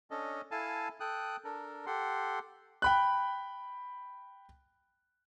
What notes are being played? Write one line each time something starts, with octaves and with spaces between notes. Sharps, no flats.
C#4 D4 A4 D#5
E4 A4 F5 G#5 A5
A4 G5 D#6 F#6
D4 A4 A#4
G4 A4 F#5 C6
G5 B5 F#6